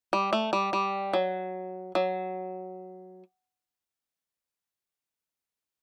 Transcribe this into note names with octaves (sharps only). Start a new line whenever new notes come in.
G3
A3
G3
G3
F#3
F#3